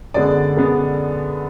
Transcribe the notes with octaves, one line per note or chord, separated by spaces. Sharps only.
F#2 D3 G#3 B3 D5
F#2 D3 G#3 B3